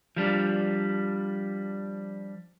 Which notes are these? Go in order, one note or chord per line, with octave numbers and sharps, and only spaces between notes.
F3 G3 D4